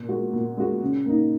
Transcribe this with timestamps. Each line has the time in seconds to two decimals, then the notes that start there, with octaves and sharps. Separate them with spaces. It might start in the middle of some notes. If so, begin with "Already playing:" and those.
Already playing: A#2
0.08 G#3 F#4
0.33 A#2
0.57 G#3 F#4
0.82 C#3
1.06 A#3 D#4